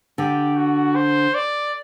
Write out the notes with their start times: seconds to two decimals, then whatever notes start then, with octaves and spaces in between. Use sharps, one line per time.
0.18 D3 G4
0.56 F#4
0.96 C5
1.35 D5